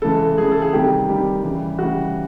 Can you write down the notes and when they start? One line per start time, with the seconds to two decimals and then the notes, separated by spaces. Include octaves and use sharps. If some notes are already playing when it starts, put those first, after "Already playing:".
0.02 C#3 E3 G#3 A4
0.37 C#3 E3 G#3 G#4
0.51 A4
0.62 G#4
0.73 C3 D#3 G3 G4
1.09 C3 D#3 G3
1.43 C#3 E3 G3
1.79 C#3 E3 G3 F#4